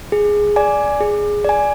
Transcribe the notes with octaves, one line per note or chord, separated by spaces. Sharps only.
G#4
D5 G#5
G#4
D5 G#5